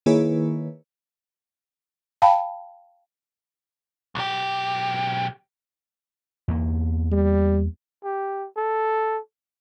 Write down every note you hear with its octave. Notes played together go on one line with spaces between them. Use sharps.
D#3 A#3 E4 G#4 B4 C#5
F5 G5 A5 B5
B1 G4
E2 A#3
G3
G4
A4